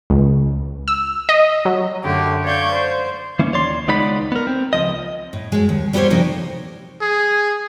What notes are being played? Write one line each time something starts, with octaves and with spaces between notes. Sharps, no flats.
C#2
E6
D#5
F#3
F#2 D3 A3 G4
C#5 D5 F5 C#6 G6 G#6
C5
E3 A#3 C#4
D#2 C#5 D5 C6
C#2 G#3 B3 D#4 D5 B5
B3 A#4
C4
C#2 F3 D#5
A2
F#2 G#3
D#2
G3 B3 G4 A4 C5 C#5
C3 F3 A3 A#3 D#4
G#4